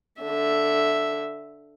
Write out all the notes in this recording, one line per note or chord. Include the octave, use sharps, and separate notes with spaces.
D3 E5